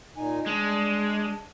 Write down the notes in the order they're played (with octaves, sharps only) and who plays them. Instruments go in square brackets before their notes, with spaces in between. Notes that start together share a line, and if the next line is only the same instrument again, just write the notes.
[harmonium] A#2 D#4 G#5
[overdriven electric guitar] G#3 [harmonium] D4